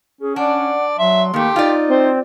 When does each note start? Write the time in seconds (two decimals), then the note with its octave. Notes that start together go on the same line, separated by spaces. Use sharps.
0.21 C#4 G#4
0.36 D4 D5 F#5
0.99 F#3 E5 C6
1.34 D#3 A3 A#3 G4
1.56 D#4 F4 D5
1.88 C4 C5